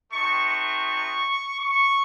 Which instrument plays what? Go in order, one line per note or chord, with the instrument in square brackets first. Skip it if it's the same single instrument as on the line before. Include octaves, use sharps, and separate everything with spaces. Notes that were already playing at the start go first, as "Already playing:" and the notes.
[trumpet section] A3 C4 D#4 F#4 C#6
C#6
C#6